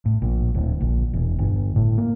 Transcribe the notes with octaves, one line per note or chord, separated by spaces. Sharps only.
A2
A#1
D1
A#1
E1
G1
A2
A#3